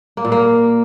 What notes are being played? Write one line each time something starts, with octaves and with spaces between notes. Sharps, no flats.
A#3
A#2
A#3